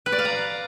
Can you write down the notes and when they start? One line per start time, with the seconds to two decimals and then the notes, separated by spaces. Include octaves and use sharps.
0.06 B4
0.12 D5
0.19 F5
0.25 A#5